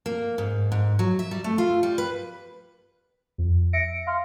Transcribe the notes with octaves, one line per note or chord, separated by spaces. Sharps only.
A#3
G#2
G#2
F#3
E5
G3
A3
F4
G3
B4
F2
E5 A#6 C#7 D7
F5 C6 F6